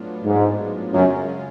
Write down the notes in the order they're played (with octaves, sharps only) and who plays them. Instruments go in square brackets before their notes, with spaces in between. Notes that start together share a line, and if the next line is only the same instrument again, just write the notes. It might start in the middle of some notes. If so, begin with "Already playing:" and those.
Already playing: [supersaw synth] A2 F#3 B3 D4 F4
[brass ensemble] G#2
[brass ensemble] F#2 [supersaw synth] C#3 G#3 C#4 F4